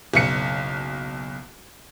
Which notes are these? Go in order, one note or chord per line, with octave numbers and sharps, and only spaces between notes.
F#1 B1 C#7